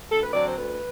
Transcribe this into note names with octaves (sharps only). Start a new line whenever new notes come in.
D2 A4
B4
D3 F#3 C4 D5
C5
D2 B4